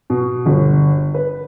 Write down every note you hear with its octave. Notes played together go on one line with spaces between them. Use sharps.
B2
G1
B4